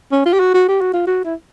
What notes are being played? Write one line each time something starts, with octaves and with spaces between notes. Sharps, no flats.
C#4
F4
G4
F#4
F#4
G4
F#4
F4
F#4
E4